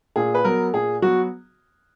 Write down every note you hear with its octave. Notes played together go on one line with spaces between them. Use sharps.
A#2 G#4
B4
F#3 B3 A#4
A#2 G#4
F#3 B3 F#4